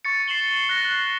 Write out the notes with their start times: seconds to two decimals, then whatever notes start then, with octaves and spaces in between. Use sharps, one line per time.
0.05 C#6 A6 C#7
0.28 C7 E7 F#7 G7
0.69 F#6 A#6